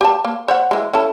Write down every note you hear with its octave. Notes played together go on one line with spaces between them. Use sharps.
G4 G#5 A5
A#3
C5 C#5 F#5
E3 G#3
C#4 E4 A4